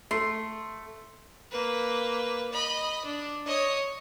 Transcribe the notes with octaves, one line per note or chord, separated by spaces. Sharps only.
A3 C6
A#3 B4
D#5 B5
D4
C#5 D#5